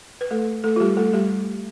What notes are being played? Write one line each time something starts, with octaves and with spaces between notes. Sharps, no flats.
B4
A3 A4
A3 A4
F4
G3 G4
A3 A4
G3 G4